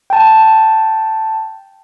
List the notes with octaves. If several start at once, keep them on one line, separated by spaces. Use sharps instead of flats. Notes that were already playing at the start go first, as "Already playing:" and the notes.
G5 A5